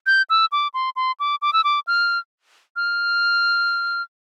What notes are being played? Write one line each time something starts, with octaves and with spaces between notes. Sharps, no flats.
G6
E6
D6
C6
C6
D6
D6
E6
D6
F6
F6